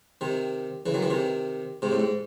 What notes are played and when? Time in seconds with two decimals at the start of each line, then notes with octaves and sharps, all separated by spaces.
0.21 C3 D#3
0.86 C#3 E3
0.94 D#3 F#3
1.02 C#3 E3
1.10 C3 D#3
1.82 G#2 C3
1.92 A2
2.00 G#2